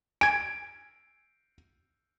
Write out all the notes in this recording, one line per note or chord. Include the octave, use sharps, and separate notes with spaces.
G#5 G#6 D7